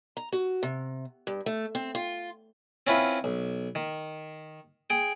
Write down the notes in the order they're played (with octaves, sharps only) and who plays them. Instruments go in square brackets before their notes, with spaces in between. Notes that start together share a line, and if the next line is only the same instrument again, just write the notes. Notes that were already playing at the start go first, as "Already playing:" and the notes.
[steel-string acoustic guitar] A#5
F#4
C3
G2
A3
C4
F4
[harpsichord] C4 C#4 E4 F4 B4
B1
D#3
G#4 G5